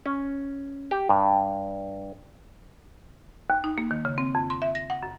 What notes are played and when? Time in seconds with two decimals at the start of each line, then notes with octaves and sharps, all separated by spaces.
0.06 C#4
0.91 G4
1.09 G2
3.50 D#2
3.64 D#4
3.78 A#3
3.91 D#3
4.05 C#3
4.18 C4
4.35 F2
4.50 C6
4.62 E5
4.75 A#6
4.90 F#5
5.03 F#2